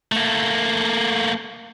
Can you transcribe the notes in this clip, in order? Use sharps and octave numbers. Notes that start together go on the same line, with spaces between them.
A3 A#3